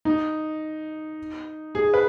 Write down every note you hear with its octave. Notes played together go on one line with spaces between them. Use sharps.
D#4
G#4
B4